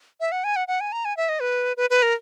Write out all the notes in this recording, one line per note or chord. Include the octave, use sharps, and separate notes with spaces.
E5
F#5
G#5
F#5
F#5
G#5
A#5
G#5
E5
D#5
B4
B4
B4
A#4